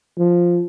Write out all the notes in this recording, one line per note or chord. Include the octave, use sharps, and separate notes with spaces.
F3